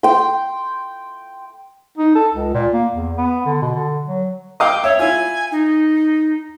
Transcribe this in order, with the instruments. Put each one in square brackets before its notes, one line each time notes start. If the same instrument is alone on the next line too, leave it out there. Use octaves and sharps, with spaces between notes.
[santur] G5 C6
[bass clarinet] D#4
A4
C#2
A#2
A#3
E2
B3
D3
B2
D3
F#3
[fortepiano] D#5 F5 D6 [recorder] G5
[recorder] C#5 [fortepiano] E5
[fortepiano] E4 F4 [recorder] G#5
[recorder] D#4